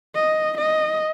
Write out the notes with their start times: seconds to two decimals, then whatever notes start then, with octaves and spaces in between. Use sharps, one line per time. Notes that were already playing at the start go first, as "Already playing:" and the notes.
0.15 D#5
0.58 D#5